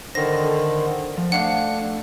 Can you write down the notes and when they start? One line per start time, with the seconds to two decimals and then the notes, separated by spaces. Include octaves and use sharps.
0.15 D3 D#3 A4 C5 A#6
1.18 F3
1.32 A3 D4 F5 F#5